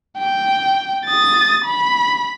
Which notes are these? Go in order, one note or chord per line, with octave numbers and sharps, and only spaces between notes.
G5
D#6 A6
B5